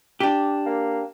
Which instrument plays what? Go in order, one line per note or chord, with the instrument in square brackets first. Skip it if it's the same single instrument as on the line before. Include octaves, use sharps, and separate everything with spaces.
[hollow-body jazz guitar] D4 G4
[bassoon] A#3